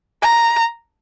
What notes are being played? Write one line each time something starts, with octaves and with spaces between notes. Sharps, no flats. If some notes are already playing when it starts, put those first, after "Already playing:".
A#5